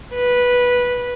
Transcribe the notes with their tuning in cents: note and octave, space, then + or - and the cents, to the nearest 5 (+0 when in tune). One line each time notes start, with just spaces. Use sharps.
B4 -10